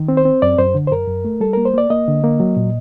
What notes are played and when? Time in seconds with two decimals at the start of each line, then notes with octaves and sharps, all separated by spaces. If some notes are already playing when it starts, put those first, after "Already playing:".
Already playing: D#3
0.08 C4
0.17 C5
0.25 C4
0.42 F#2 D5
0.58 F#2 C5
0.75 D3
0.87 C5
0.91 F#2 A#4
1.07 F#2
1.25 A3
1.40 G3 A4
1.53 A#3 A#4
1.65 C5
1.74 A#3 D5
1.90 A#3 D#5
2.08 D3
2.24 A#3
2.40 F#3
2.57 A#2